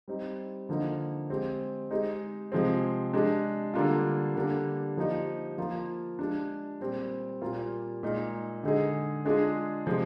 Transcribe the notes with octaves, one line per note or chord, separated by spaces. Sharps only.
G3 C4 D#4
D3 F3 A#3 D#4
G#3 C4 G4
G#3 D#4 G4
C3 F3 G#3 C4
G#3 D4 G4
D3 G3 A#3 D4 F4
D3 G3 A#3 D4
F3 A#3 D#4 G4
F3 A#3 F4
G#3 D4 G4
A#2 G3 C4 G4
A#2 G3 A#3 F4
A#2 G#3 D#4
D3 G#3 D#4 G#4
G#3 D4 F4 G#4
C3 F3 G#3